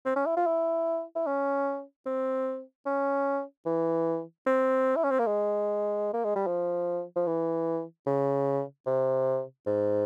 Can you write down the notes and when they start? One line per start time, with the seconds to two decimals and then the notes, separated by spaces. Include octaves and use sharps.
0.06 C4
0.16 C#4
0.26 E4
0.36 F4
0.46 E4
1.15 E4
1.26 C#4
2.06 C4
2.86 C#4
3.66 E3
4.46 C4
4.96 E4
5.04 C#4
5.11 C4
5.19 A#3
5.26 G#3
6.13 A#3
6.24 G#3
6.36 G3
6.47 F3
7.16 F3
7.27 E3
8.06 C#3
8.86 C3
9.66 G#2